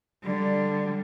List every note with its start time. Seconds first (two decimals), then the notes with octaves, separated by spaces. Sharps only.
0.23 D3 G3